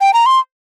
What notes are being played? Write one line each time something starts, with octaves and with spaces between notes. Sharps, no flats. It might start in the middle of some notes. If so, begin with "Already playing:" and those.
G5
A#5
C6